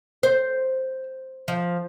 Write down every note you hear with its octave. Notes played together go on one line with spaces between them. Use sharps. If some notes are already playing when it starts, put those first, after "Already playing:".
C5
F3